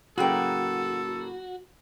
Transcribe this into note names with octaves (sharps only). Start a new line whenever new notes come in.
A2 C#3 F#3 A#3 F#4 G#4 A4 G5